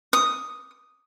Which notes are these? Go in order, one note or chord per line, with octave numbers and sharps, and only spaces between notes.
D#6